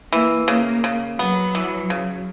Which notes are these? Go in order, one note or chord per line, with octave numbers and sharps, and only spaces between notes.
E3 A#3
C#3 A#3
C#3
F#3 B3
E3
C#3